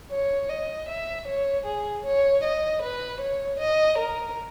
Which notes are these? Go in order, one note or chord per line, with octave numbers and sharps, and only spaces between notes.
C#5
D#5
E5
C#5
G#4
C#5
D#5
B4
C#5
D#5
A#4